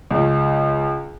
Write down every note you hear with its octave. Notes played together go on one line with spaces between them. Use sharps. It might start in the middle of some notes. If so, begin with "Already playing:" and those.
C#2